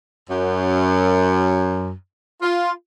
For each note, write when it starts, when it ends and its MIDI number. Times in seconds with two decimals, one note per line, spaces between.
0.29 1.92 42
2.42 2.71 65